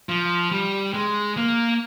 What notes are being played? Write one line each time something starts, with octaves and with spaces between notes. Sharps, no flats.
F3
G3
G#3
A#3